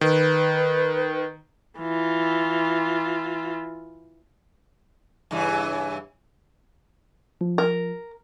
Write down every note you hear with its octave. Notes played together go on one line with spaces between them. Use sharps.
D#3 B4
E3 F4
G2 C#3 E3
F3
A#4